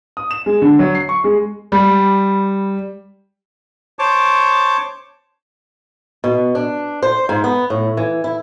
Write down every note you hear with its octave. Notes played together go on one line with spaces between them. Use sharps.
D#6
E7
G#3
D3
F#3
C7
C#6
G#3
G3
C5 C#5 A5 D6
B2
D4
C5
G#2
B3
A2
E3
E4